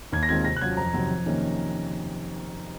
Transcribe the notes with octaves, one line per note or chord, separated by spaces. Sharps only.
D#2 G#6
A#6
D#3 G#3 C4 F4 G#6
C3 A#6
F#6
F#3 C#4 F4 G#6
F2 A#5
C3 D#3 F#3 C4
F2
C3 D#3 A#3 C#4